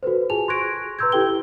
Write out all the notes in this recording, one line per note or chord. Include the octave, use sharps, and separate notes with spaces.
F#4 A4 B4 C5
F4 G#4 G#5 A5 F7
C6 C#6 F#6 G#6 A#6 D7
B4 A#5 C6 E6 G6 G#6
E4 G4 A4 G5 G7